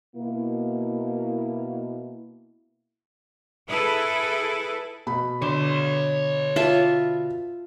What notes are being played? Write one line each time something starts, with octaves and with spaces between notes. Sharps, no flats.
B2 A#3 E4
E4 G#4 A4 B4
B2 B5
D3 C#5 C6
F4 E5 A5